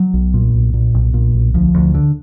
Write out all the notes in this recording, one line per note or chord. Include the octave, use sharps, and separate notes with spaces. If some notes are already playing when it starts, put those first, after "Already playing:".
Already playing: F#3
B1
A#2
B1
A#2
B1
A#2
B1
D2 F3
D2
D3